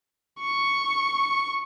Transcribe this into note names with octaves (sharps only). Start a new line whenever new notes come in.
C#6 C#7